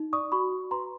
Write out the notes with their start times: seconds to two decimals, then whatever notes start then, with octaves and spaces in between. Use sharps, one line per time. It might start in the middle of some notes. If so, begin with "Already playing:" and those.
Already playing: D#4
0.13 D5 C#6 D#6
0.32 F#4 B5 C#6
0.51 F#4
0.71 B4 A#5 C6